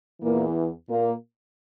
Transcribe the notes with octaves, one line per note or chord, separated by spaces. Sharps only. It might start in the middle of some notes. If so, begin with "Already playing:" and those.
E2 A#2 E3 A#3
A#2 A#3